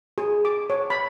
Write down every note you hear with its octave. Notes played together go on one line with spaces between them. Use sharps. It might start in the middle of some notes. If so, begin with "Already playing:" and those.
G#4
D6
C#5
B5